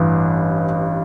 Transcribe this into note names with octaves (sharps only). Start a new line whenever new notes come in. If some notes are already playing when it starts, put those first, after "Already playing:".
Already playing: A1 G2 E3